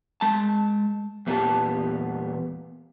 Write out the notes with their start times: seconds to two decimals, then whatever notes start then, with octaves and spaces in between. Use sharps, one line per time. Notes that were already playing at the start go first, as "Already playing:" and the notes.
0.21 G#3 A5
1.27 E2 A#2 B3 D4 G4 A5